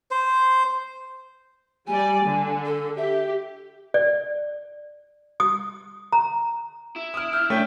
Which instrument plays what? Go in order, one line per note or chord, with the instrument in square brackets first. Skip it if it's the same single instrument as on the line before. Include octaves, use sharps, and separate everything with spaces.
[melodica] C5
[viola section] G3 D5 [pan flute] G#5
[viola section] D3
[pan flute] A4
[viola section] G4 [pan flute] E5
[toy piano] D5
D#6
A#5
[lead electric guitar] E4
[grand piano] D#6 F6
[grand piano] E6 G6 [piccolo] F6
[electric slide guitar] A3 [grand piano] C#4 D4 [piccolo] G5